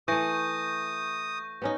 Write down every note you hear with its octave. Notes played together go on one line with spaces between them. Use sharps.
E3 A3 C#6 D#6 G6 A#6
B3 C#4 D#4